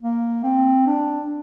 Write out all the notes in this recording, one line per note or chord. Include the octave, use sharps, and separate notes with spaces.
A#3
C4
D4